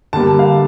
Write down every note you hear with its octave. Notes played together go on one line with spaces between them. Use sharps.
D3 G3 A#3 A5
F5